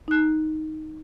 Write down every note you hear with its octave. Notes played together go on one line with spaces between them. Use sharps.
D#4 F#6